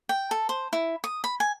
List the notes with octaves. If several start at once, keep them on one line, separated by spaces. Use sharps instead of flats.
G5
A4
C5
E4
D#6
B5
G#5